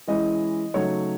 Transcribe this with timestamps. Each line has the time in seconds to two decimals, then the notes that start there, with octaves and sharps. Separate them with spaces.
0.07 E3 G#3 C#4 E4 D#5
0.74 C#3 F#3 A3 D#4 C#5